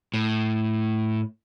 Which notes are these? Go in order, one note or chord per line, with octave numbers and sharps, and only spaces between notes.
A2